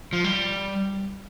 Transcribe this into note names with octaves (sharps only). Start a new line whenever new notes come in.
F3
G3